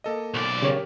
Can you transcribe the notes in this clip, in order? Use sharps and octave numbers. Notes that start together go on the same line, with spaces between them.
A#3 A4 D#5
B1 D5
C#3 G4 A#4 C#5